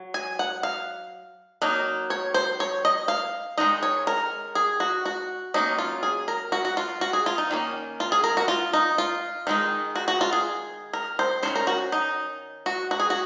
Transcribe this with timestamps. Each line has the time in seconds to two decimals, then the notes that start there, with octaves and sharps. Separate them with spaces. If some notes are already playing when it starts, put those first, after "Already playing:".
Already playing: F#3
0.14 G#5
0.39 F#5
0.63 F5
1.62 F#3 A#3 D#4
2.10 C#5
2.34 C5
2.60 C#5
2.85 D#5
3.08 F5
3.58 D#3 G#3 D#4 D#5
3.83 C#5
4.07 A#4
4.55 G#4
4.80 F#4
5.06 F#4
5.54 F#3 A#3 C#4 D#4
5.78 F4
6.03 G#4
6.28 A#4
6.52 F#4
6.65 F#4
6.77 F4
7.01 F#4
7.13 G#4
7.26 F4
7.38 D#4
7.51 D#3 A#3 C#4
8.00 F4
8.12 G#4
8.24 A#4
8.37 F#4
8.48 F4
8.73 D#4
8.98 F4
9.47 D#3 G#3 D#4
9.96 F#4
10.08 F#4
10.21 F4
10.33 G#4
10.93 A#4
11.19 C5
11.43 D#3 F#3 C#4 C5
11.56 A#4
11.67 F#4
11.92 D#4
12.66 F#4
12.91 F#4
13.00 G#4
13.10 F#4